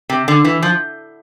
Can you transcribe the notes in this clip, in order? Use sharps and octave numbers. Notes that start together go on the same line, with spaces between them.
C3
D3
E3
F3